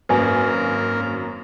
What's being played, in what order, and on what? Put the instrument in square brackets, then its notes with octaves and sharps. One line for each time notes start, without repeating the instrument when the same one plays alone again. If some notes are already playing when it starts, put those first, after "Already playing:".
[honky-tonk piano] G#1 F#2 [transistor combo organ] A#3 [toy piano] B4 G#5